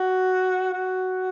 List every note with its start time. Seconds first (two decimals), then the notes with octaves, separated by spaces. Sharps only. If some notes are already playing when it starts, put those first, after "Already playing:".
Already playing: F#4
0.73 F#4